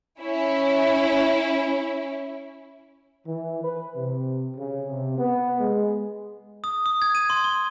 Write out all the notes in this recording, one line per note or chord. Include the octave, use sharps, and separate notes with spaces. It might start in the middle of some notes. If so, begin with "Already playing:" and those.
C#4 E4
E3
B4
C3
C#3
C3
B3
G#3
D#6
D#6
G#6
D#7
C6
G7